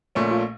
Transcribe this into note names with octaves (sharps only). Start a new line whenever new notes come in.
A#1 A#2 A3 C#4
F4